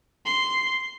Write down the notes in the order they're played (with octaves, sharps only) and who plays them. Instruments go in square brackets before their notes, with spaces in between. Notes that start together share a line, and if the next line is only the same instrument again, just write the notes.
[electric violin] C6